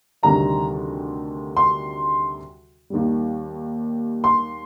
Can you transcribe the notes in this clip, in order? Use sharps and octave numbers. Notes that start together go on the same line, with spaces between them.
D2 C3 D#3 G3 D4 A#5
C6
D#2 D#3 G3
C6